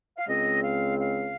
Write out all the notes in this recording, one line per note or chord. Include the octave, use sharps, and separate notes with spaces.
F5
C#2 C#3 G#3 C4 D#5
F5
F5